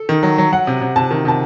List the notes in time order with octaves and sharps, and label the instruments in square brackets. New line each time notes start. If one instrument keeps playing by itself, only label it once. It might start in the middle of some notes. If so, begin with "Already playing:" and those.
Already playing: [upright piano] A4
[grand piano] D#3
F#3
F#3
[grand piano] F#3 [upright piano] F#5
[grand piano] C3
C3
[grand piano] C3 [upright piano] A5
[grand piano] D#3
[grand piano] C3 [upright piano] A5